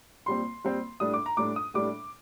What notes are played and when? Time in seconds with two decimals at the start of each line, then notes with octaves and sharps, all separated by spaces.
0.26 A#2 G3 C4 C6
0.64 A#2 G3 C4
1.00 A2 G3 D4 D#6
1.14 D6
1.26 A#5
1.37 A2 G3 D4 D6
1.56 D#6
1.74 A2 G3 D4 D6